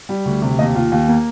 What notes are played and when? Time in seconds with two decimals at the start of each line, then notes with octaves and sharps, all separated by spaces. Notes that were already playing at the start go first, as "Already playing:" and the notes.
0.09 G3
0.25 D2
0.42 C3
0.59 D#2 D#5
0.75 D#2 F4
0.92 D#2
1.08 A#3